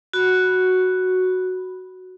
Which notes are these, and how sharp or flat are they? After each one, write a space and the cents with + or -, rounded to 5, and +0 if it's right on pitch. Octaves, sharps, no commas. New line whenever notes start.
F#4 +0 B5 +0